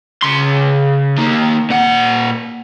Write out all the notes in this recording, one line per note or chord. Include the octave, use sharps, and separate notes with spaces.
C#3 C6
D#3 A#3
A#2 F#5